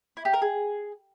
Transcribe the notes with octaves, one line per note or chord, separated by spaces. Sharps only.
E4
G4
A#4
G#4